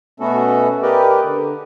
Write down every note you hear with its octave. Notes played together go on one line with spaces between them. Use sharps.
B2 A3 B3 C#4 F#4 A4
G4 A#4 B4 D5 D#5
D3